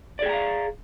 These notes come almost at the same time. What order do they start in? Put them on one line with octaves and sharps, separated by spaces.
D5 G#4 G5 A#5 F5